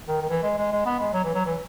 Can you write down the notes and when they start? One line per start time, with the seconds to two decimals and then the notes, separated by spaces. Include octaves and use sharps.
0.08 D#3
0.21 D#3
0.29 E3
0.43 G#3
0.58 G#3
0.72 G#3
0.86 B3
0.99 G#3
1.13 F#3
1.24 E3
1.34 F#3
1.45 E3